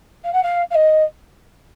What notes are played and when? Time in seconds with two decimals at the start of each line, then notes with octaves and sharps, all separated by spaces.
0.24 F5
0.33 F#5
0.43 F5
0.71 F5
0.75 D#5